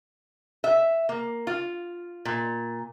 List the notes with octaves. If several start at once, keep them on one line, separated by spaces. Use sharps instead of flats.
E5
A#3
F4
A#2